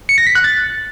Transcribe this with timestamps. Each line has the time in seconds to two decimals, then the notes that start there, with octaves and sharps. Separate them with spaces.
0.09 C#7
0.18 A#6
0.27 B6
0.35 F#6
0.44 A6